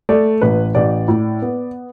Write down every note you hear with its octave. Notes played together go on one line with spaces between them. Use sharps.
A3 D5
A1 B4
A1 D5
A2
B3